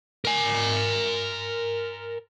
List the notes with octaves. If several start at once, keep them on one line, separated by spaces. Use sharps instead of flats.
A#4 G#5